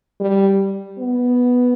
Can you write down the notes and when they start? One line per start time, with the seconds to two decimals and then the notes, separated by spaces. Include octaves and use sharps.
0.20 G3
0.99 B3